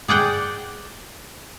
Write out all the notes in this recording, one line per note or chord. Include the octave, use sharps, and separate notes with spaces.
G#4 D5 F#5 G5